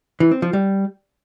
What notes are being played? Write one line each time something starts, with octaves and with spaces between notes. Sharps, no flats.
E3
C4
F3
G3